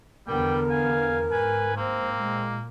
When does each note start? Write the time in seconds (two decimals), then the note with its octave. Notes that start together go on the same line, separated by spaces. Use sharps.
0.28 E2 D3 G3 B3 A#4 G5
0.70 F5 G#5
1.31 G#2 B4 G#5
1.77 A#3 C4 C5
2.19 A#2 G#3